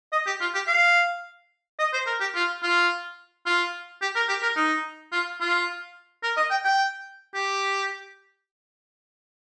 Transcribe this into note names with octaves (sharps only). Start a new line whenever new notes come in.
D#5
G4
F4
G4
F5
D#5
C5
A#4
G4
F4
F4
F4
G4
A#4
G4
A#4
D#4
F4
F4
A#4
D#5
G5
G5
G4